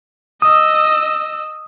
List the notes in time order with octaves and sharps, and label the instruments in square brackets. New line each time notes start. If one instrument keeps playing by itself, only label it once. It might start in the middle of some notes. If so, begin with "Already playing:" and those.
[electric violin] D#5 E6 [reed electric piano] D#6